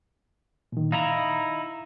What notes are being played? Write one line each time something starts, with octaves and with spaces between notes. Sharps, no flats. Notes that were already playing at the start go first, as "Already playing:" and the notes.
A#2 D#3
D#4 E4 F5 A#5